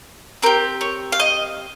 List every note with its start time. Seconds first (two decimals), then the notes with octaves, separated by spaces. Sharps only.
0.43 C4 G4 A#4
0.81 C#5
1.12 F5
1.20 D#5